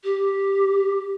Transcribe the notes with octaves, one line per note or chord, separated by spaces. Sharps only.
G4